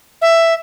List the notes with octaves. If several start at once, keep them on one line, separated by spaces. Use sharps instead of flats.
E5